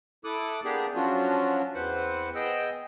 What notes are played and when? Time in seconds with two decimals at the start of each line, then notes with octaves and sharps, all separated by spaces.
0.24 E4 A4 D6 D#6 F#6
0.64 A#3 B3 D4 G4 G#4
0.95 F3 F#3 C#4 D4 F4 F#4
1.75 E2 C4 B4 C5 F#5
2.35 B3 G#4 D#5 G5 E6